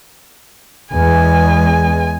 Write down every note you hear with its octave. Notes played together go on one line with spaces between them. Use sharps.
E2 G#3 G#5